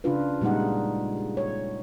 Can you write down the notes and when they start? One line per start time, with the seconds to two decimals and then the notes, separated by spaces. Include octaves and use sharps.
0.04 C#3 D4 F4 B4
0.41 A#2 G3 G#3 D#4 F#5
1.37 C#5